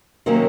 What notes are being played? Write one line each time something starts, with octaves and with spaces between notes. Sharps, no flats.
C3 D#3 F#3 A#3 C#4